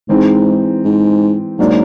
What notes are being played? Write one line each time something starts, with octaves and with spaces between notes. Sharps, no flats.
G#2 E3 G#3 C4 D#4
G#2
G#2 F#3 A#3 D4